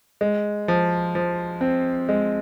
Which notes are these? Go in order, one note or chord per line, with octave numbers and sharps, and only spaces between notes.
G#3
F3
F3
C4
G#3